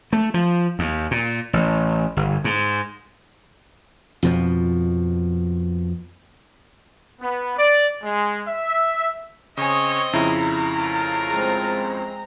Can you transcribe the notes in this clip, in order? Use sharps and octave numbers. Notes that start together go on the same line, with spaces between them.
A3
F3
D#2
A#2
A1
G1
G#2
F2 B2 F3
B3
D5
G#3
E5
C#3 C4 C#5 D#5 G#5
F2 C#3 E4 A#5
A3 F4 A#4
G#3 C4